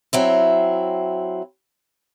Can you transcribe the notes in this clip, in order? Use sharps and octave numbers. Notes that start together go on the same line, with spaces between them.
F#3 C4 E4